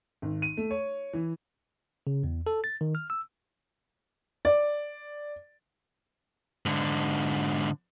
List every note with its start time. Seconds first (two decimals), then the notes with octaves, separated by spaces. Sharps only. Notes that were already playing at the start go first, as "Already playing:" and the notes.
0.22 G#1
0.42 D#7
0.57 A3
0.71 C#5
1.13 E3
2.07 C#3
2.23 E2
2.47 A4
2.64 A6
2.81 D#3
2.95 F6
3.10 E6
4.45 D5
6.66 G#2 D3